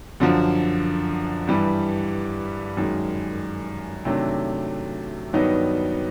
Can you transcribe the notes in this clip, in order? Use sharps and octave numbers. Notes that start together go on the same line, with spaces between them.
F#2 D3 F3
G2 E3 G3
F#2 D#3 G#3
C3 D#3 F#3 A3 D4
G2 D#3 F#3 B3 D#4